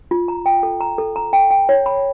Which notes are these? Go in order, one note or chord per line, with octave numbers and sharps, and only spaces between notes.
F4
A#5
G5
A4
A#5
A4
A#5
G5
G5
C#5
B5